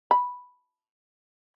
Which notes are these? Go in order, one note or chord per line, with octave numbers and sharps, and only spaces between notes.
B5